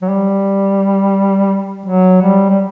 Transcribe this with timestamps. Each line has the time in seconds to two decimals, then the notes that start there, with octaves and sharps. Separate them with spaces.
0.02 F#3
0.09 G3
1.86 F#3
2.22 G3
2.49 G3